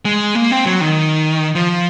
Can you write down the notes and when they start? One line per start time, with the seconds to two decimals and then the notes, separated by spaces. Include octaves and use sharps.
0.05 G#3
0.35 A#3
0.51 C4
0.66 F#3
0.81 D#3
1.55 F3